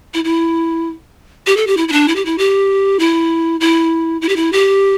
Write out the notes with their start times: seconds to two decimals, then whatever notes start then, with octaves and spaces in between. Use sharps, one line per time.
0.14 E4
0.24 E4
1.47 G4
1.57 A4
1.67 G4
1.77 E4
1.88 E4
1.92 D4
2.08 E4
2.16 G4
2.25 E4
2.38 G4
2.99 E4
3.60 E4
4.22 E4
4.29 G4
4.36 E4
4.52 G4